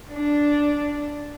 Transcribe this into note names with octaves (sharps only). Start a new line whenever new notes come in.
D4